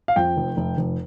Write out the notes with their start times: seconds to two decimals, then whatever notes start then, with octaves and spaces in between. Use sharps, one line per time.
0.08 F5
0.16 F2 G5
0.37 F1
0.57 F1
0.77 F1